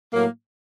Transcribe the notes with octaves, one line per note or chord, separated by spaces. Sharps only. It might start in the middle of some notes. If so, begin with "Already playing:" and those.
A2 F#3 A#3